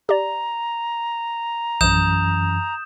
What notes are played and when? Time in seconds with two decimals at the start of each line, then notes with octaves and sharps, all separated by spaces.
0.09 G4 D5 A#5
1.81 A#1 F#2 E3 D#6 G6 E7